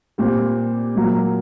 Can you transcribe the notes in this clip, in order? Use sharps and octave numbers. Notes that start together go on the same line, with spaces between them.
A#2 G3 C4
A#2 F#3 A#3